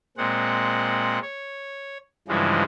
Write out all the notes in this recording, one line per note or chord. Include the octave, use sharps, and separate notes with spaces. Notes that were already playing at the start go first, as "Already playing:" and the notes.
A#2 G#3 C4 F#5
C#5
G2 C#3 E3 F3 G#3